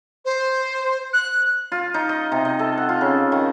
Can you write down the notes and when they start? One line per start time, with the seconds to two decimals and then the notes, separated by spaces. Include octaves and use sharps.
0.25 C5
1.13 F#6
1.72 F4
1.94 D#4
2.09 D#5
2.32 C3
2.45 D#5
2.59 A4
2.77 F#5
2.89 F4
3.01 C#3
3.32 D#3